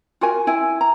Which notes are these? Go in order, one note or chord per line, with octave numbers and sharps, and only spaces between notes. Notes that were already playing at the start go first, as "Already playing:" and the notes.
F4 F#4 A#4 G#5
E4 G#5
A#5